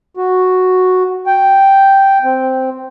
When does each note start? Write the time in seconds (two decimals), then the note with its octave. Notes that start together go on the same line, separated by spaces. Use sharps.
0.17 F#4
1.26 G5
2.24 C4